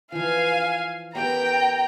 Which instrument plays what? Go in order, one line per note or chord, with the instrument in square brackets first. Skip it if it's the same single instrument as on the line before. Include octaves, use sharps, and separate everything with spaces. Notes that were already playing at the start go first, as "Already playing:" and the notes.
[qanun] E3 F3 [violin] F5 G#5
[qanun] B3 G4 A#4 [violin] G5 A#5